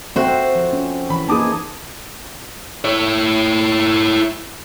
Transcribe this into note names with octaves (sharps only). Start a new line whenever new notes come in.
C4 F#4 A4 C5 E5 G5
F3
C#4
E3 B5
A#3 D#4 G#4 A5 D6 D#6
E4 C#5